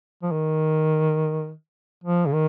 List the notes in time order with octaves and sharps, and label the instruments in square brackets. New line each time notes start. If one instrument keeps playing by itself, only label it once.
[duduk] F3
D#3
F3
C#3
D#3